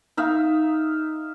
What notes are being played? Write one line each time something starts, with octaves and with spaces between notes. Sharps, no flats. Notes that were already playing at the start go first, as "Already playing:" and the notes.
D#4 E5 F5